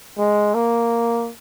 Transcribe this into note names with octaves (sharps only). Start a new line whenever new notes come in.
G#3
A#3